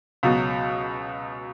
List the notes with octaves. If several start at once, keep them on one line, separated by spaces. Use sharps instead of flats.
C#2 B2 F#3